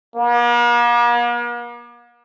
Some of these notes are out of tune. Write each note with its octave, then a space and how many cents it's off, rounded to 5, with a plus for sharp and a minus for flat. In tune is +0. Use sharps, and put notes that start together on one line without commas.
A#3 +45